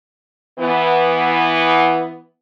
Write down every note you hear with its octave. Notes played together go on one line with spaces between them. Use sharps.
E3 B3